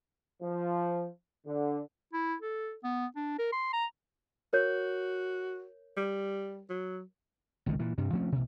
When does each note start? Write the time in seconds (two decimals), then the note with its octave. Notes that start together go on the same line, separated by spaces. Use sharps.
0.42 F3
1.46 D3
2.13 E4
2.42 A4
2.84 B3
3.16 D4
3.39 A#4
3.53 C6
3.73 A#5
4.53 F#4 A#4 C#5 G6
5.97 G3
6.70 F#3
7.66 G#1 C#2 A2 D#3
7.79 A#2 E3
7.98 G2 C3 G3
8.13 F3 A3 C4 C#4
8.32 A1 B2